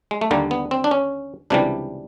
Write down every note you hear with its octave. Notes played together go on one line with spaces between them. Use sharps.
G#3
A3
D#2 D3 G3 A#3
B3
C4
D4
C#4
C#2 C3 E3 G3 D4